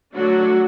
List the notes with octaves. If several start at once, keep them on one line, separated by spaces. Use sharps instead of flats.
D3 F#3 A3 D4 F#4